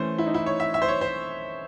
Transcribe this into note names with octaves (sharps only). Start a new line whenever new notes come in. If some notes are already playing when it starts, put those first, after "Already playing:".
Already playing: E3 A3 C#4 C5
E4
D#4
E4
C#5
E5
E5
C5
C#5
C5